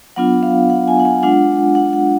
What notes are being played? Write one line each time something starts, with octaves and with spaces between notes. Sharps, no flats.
F#3 B3 D4 F4 F#5
F5
F#5
G#5
F#5
G#5
G#3 D4 F4 F#5
F#5
F#5